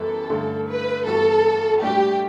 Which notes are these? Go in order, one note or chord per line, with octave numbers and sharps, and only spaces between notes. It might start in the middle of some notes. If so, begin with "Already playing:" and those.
Already playing: F#2 E3 G3 B3 E4 A4
G2 D3 A3
B4
G2 E3 G3 B3 F#4 A4
A2 G3 D4 F#4 G4